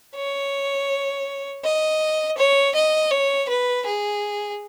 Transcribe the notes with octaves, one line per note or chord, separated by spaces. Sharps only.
C#5
D#5
C#5
D#5
C#5
B4
G#4